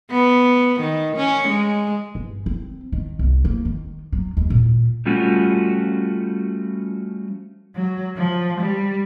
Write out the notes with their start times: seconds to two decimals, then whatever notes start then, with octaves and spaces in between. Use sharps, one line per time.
0.11 B3
0.80 D#3
1.16 C#4
1.48 G#3
2.15 G2
2.46 C4
2.92 D#3
3.19 C2
3.45 A#3
3.65 D#3
4.12 F#3
4.37 D#2
4.50 A#2
5.06 F3 G3 A3 C#4 F4 F#4
7.76 F#3
8.17 F3
8.60 G3